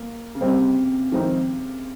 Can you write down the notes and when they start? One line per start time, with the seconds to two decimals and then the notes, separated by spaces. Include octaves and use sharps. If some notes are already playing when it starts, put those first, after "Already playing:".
Already playing: A#3
0.35 C#3
0.41 C3 G3 C4 G4 C5 D#5
1.12 F2 D#3 G#3 C4 D#4